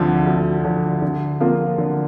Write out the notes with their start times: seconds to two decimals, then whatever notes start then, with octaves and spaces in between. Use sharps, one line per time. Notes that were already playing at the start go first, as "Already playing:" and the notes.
Already playing: D2 D3 F3
0.26 D2
0.65 D3 F3
1.02 D3
1.40 F3 A#3 F4
1.78 D3